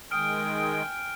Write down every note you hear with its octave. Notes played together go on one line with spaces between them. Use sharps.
D#3 G#3 G5 G#5 D#6 F6 D7